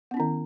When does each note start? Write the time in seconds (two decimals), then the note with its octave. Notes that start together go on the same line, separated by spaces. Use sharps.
0.11 B3
0.14 C#4
0.17 E4
0.20 D#3